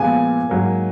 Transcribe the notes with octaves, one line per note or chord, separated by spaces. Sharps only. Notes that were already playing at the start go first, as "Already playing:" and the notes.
Already playing: A#2 F3 G#3 B3 G#5
G#2 F#3 A#3